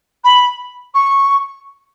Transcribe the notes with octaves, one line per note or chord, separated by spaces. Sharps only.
B5
C#6